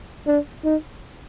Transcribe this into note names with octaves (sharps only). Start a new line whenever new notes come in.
D4
D#4